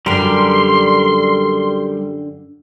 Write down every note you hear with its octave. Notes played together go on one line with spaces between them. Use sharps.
F#2 D3 G3 G4 A#4 C6